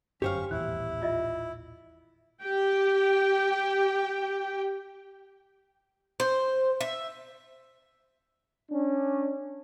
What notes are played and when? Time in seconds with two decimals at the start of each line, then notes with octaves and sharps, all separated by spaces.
0.22 G1 F#2 C#4 G4 C5 F5 C#6
0.51 D#1 A1 E2 E4 F#6
1.02 F4 D#5 E5
2.42 G4 G5
6.20 C5
6.81 E5
8.72 C#4 D4